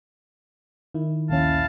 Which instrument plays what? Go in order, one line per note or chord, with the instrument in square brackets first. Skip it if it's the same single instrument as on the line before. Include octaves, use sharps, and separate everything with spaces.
[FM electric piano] D#3 E4
[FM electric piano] A#1 D#2 C#4 [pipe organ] E4 F5 A5